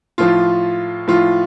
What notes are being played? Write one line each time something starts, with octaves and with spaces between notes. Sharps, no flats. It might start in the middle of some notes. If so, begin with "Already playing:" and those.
A2 F3 F4
A2 F3 F4